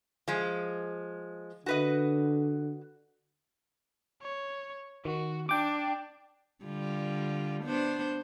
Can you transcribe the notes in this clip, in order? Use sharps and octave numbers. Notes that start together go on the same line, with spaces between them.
F3 G#3
D3 F#4 B4 D#5
C#5
D#3 F#4
D4 G5 D6
D3 G3 F4
B3 D4 C5